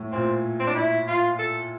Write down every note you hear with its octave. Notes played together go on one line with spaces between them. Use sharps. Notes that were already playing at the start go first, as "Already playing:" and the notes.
Already playing: A2
A#2 C4
C4
D4
E4
F4
A4